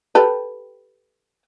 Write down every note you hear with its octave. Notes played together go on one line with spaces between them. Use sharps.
G4 A4 B4